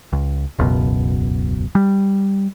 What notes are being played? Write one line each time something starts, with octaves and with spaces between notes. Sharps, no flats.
C#2
E1 C#2 F#2 B2
G3